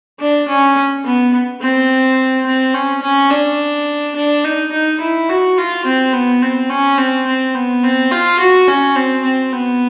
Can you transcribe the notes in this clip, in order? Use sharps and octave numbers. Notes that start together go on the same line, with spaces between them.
D4
C#4
B3
C4
C4
C#4
C#4
D4
D4
D#4
D#4
E4
F#4
F4
C4
B3
C4
C#4
C4
C4
B3
C4
F4
F#4
C#4
C4
C4
B3